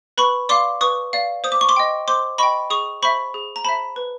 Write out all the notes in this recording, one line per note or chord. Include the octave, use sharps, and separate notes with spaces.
B4 B5 C#6
D5 F5 C6 D6
B4 C#6 D#6
D5 F5
C5 D#6
D6
C#6
C6 D6
D#5 G5
C5 C6 D6
D#5 G5 B5 C#6
G#4 C#6 D#6
C5 E5 B5 C#6
G#4
A#5
C5 E5 A5 B5
B4